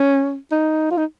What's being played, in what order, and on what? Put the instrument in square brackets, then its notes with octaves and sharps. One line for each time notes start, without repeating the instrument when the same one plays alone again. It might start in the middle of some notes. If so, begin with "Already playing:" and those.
Already playing: [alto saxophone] C#4
D#4
F4
D#4